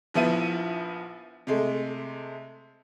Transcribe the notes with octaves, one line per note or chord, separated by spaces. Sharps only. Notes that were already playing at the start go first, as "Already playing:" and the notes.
A#1 F3 B3 E4 D#7
C3 G#3 A3